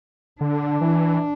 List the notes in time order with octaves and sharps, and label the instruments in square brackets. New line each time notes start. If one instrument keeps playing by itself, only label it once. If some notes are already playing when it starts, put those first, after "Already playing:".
[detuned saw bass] D3 [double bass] D4
[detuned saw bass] E3